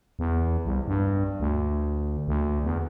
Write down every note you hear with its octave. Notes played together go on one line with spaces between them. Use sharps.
E2
C2
G2
D2
D2
E2